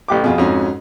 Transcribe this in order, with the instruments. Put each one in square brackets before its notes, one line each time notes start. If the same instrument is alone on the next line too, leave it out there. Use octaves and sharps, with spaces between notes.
[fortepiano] A1 G4 D6
[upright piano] F2 F4 G#4 [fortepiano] B2
[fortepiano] F2 [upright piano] G#2 C#4 F#4